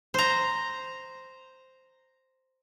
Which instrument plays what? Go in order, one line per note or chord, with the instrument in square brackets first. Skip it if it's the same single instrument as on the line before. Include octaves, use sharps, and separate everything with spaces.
[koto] C5 A#5